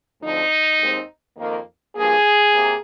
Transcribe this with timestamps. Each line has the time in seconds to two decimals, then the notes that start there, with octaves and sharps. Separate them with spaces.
0.21 D2 D3 F3 C4 D#4
0.79 D#2 D#3 G#3 C4
1.37 F2 D#3 A#3
1.95 G2 F3 A#3 G#4
2.53 C3 A#3